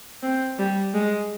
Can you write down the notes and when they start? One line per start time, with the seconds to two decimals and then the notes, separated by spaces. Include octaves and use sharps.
0.23 C4
0.59 G3
0.94 G#3